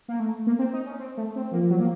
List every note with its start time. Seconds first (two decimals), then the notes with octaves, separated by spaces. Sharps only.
0.08 A#3
0.20 A3
0.47 A#3
0.59 C4
0.73 D#4
0.86 C#4
0.99 C4
1.17 A3
1.36 C4
1.53 F3 A#3
1.70 F#3
1.80 A#3